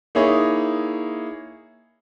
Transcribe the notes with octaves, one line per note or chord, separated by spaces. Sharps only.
A#3 D#4 E4 G#4 C#5